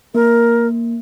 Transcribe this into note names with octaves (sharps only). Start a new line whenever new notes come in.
A#3 A#4